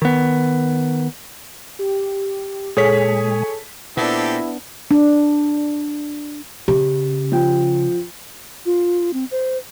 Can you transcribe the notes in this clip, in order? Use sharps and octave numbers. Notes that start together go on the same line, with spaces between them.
D#3 B3
G4
A#2 G#3 G#4 A4 C#5 G#5 B6
A#2 B3 C4 D4 E4 G4 A4
D4
C#3 G4
F3 G5
F4
C4
C5